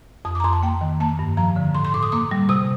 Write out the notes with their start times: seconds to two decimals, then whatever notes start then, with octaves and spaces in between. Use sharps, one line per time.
0.25 F2 D#6
0.35 D6
0.40 A#5
0.44 F2 C6
0.53 A5
0.63 A#3 G5
0.81 D#3
1.00 A#3 A5
1.19 G2
1.37 F3 A#5
1.56 D3
1.75 A2 C6
1.85 C6
1.94 A2 D6
2.03 D#6
2.12 A#3 D6
2.31 G3
2.49 C3 D#6